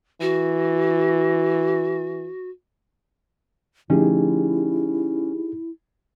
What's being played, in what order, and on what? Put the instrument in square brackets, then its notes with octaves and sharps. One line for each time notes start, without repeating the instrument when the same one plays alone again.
[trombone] E3 [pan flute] F#4
[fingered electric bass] D3 F3 A3 [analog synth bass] C#4 [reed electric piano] D#4 G4 G#4 [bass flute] E4